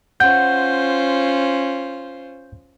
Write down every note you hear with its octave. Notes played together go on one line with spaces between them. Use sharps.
C#4 F4 C5 F#5 G6